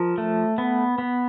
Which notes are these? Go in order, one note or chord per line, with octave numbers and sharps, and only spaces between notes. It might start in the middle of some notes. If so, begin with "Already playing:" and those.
Already playing: F3 A#4
A3
B3
B3